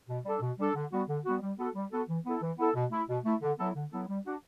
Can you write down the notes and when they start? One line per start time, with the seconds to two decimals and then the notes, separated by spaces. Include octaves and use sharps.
0.08 B2
0.25 G3 D4 A4
0.41 B2
0.58 G3 D4 A4
0.75 D3
0.91 G3 B3 F#4
1.09 D3
1.25 G3 B3 F#4
1.41 G3
1.58 B3 F#4 A4
1.75 G3
1.92 B3 F#4 A4
2.09 E3
2.25 B3 E4 A4
2.42 E3
2.58 B3 E4 A4
2.75 B2
2.91 A3 E4
3.08 B2
3.25 A3 E4
3.42 D3
3.58 F#3 B3 E4 A4
3.75 D3
3.91 F#3 B3 E4 A4
4.08 G3
4.25 D4 F#4